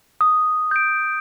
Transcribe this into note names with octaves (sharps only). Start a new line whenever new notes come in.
D#6
G6 D7